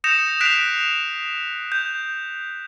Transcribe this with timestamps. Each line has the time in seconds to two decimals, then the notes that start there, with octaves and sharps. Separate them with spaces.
0.04 D#6 G6 A#6 C#7 E7 F7
0.41 F#6 G6 B6 C7 D7 F7
1.72 G6